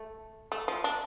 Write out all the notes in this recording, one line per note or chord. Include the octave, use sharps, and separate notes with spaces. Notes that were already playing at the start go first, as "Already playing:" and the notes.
Already playing: A3
A3
F3
D4